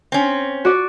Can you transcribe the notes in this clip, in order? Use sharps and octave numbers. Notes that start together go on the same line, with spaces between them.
C4 C#4
F#4 D5